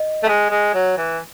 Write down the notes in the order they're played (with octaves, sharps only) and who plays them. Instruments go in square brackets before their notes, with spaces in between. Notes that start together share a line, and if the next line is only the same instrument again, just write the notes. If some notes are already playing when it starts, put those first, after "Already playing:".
Already playing: [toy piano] D#5
[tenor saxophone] A3
[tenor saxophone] G#3 [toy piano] A5
[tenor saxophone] G#3
F#3
E3